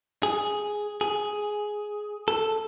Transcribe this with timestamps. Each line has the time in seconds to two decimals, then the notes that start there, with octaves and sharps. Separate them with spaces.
0.23 G#4
1.01 G#4
2.28 A4